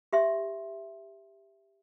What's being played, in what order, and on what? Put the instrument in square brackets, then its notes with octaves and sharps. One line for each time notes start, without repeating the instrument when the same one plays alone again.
[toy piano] G4 E5 C6